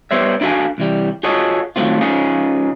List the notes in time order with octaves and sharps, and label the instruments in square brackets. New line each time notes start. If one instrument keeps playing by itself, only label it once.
[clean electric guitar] G3 B3 C5 C#5 E5
D4 E4 F#4 A4 F5 G#5
C2 E3 G3
F4 F#4 G#4 A4 C#5 D#5
D#3 E3 F#3 A3 C4 F4
C#3 F3 C#4 D#4 G#4